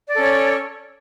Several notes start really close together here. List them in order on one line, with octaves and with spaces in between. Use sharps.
D5 A4 C#4 C#5